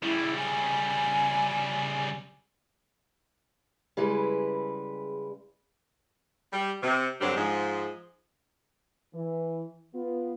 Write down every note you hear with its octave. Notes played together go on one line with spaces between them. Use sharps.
C#3 G3 E4
G#5
C#3 G3 G#3 E4 B4
G3
C3
G2 D3 F#3 G3 C4 D4
G#2 F3 G#3
E3
B3 F4